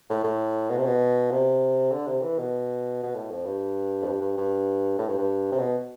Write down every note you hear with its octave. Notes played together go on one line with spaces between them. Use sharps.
A2
A2
B2
C3
B2
C3
D3
C3
E3
B2
B2
A2
F2
G2
F2
G2
G2
G2
A2
G2
G2
C3
B2